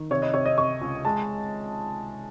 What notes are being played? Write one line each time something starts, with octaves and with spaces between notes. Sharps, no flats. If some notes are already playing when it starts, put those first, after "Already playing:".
Already playing: D#3
C3 C#5
D#5
C3 C#5
D#5
C3 C#6
C#2
G#3 A5